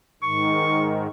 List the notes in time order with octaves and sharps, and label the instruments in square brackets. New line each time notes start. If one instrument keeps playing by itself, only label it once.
[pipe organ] G#2 D#3 [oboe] C#6